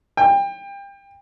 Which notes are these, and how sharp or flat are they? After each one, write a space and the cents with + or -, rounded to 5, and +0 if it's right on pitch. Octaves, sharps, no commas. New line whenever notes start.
G5 +25